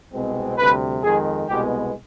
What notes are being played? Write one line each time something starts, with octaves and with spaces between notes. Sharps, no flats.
C2 B2 G#3 C4
D2 C3 G3 B4
F2 D#3 G#3 G#4
C2 B2 G#3 B3 G4